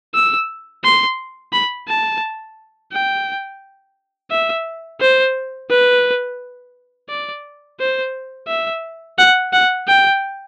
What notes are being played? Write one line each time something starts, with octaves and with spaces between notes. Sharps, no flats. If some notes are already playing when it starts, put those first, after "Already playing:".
E6
C6
B5
A5
G5
E5
C5
B4
D5
C5
E5
F#5
F#5
G5